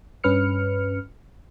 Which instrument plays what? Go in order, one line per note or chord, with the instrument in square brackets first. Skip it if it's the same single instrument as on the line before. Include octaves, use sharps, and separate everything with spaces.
[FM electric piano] G2 C#4 B4 F6 C#7